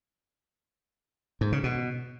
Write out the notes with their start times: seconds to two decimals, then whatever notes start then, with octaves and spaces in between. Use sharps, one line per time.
1.41 G#2
1.52 C#3
1.64 B2